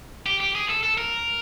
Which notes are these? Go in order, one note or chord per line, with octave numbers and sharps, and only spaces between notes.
G4
G4
G#4
A4
A4
A#4